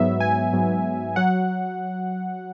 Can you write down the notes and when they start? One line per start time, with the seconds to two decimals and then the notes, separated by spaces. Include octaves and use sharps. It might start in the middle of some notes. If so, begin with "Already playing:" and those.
Already playing: G#2 F#3 B3 E5
0.20 G#5
0.53 G#2 F#3 B3
1.16 F#3 F#5